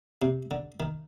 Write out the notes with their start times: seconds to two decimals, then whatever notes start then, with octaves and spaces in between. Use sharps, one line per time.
0.22 C3
0.51 D3
0.80 D#3